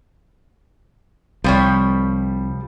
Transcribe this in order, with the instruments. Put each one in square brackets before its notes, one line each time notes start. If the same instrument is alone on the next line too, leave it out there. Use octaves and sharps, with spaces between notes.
[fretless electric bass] C2 [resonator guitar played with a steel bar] F3 G3 C#5